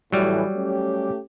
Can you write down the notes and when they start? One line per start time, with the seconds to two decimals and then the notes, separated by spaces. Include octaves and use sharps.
0.12 A2 E3 F#3 G3
0.56 A3 C#4 G4